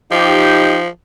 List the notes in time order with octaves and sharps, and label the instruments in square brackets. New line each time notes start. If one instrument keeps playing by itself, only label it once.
[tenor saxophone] F3 [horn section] D#4 G4